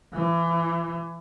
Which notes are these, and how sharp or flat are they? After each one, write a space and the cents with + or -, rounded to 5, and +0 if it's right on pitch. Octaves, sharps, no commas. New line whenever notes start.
E3 +30